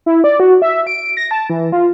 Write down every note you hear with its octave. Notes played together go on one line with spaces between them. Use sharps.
E4
D5
F#4
E5
D7
A#6
A5
E3
F4